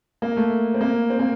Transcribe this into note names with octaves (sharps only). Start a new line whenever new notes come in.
A#3
A3
C4
A#3
C4
A#3